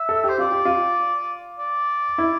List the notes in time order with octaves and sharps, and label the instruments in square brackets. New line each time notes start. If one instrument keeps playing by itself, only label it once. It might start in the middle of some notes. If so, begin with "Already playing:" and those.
Already playing: [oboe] E5
[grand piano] A4
[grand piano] G4 [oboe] C5
[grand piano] F4 [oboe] D5
[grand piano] G4
F4
[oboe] D5
[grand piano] E4